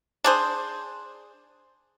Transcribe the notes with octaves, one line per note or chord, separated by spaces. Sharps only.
D4 G#4 C5